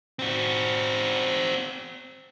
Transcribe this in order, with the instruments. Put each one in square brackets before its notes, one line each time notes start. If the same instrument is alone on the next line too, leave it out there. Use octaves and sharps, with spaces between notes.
[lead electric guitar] C4 F#4